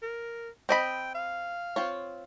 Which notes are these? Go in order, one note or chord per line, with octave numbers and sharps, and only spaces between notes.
A#4
C4 D#5 G5 B5
F5
C4 F4 C#5